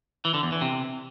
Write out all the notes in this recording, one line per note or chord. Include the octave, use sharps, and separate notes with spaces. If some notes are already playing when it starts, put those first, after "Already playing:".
E3
D3
E2
E3
C3